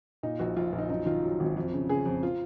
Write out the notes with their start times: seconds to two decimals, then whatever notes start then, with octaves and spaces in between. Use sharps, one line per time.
0.23 A#2 D#4
0.39 A#1 F#4
0.57 A#1 F4
0.73 A#1
0.78 D#4
0.90 F#2 D#4
1.06 D#3 F4
1.24 F#3
1.40 G#1
1.57 F2
1.73 C#3
1.89 C#3 G#4
2.06 F2
2.23 F4